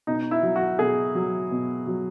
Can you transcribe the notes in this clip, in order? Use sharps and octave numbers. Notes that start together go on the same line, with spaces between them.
B2 D#4
E4
F#3
F#4
B2 G#4
F#3
B2
F#3